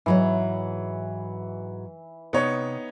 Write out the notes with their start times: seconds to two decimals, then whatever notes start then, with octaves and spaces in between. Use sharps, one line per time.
0.06 G#2 E3 F#3 C#5
2.33 C3 B3 D#4 C#5